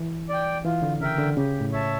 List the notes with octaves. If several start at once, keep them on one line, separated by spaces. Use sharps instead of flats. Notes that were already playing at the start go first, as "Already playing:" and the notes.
Already playing: E3
D5 G5
E3 F4
D3
C#3 A#4 E5 G5
D3
C#3 G4
A2
C#5 E5 A5